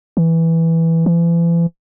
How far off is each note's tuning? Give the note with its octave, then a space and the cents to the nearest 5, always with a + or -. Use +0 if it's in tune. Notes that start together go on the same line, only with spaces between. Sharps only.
E3 -5
E3 +40